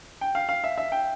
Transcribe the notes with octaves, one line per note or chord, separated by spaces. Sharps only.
G5
F5
F5
E5
E5
G5